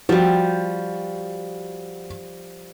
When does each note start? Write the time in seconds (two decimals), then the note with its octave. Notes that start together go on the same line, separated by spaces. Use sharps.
0.09 F3 G3 F#4